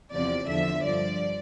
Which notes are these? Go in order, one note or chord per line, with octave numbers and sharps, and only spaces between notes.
E2 C3 F3 D5
E2 D3 F3 E5
G2 F3 D5